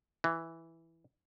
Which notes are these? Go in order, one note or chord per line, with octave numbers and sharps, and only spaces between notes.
E3